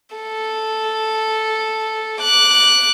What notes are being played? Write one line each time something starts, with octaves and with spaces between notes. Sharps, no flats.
A4
D6 F#6